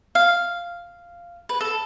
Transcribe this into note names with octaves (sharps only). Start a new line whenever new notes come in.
F5
B4
A4